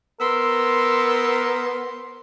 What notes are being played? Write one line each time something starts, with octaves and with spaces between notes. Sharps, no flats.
B3 A#4 C5 C6 E6